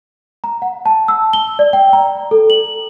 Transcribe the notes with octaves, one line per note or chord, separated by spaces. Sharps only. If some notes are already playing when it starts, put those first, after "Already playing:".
A#5
F#5
A5
E6
G7
D5
G5
A#5
A4
F#7